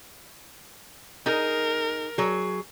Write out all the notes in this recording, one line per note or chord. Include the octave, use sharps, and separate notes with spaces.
D#4 G#4 A#4
F#3 G#4